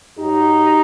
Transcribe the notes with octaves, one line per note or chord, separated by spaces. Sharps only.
F#2 F#3 D#4 G4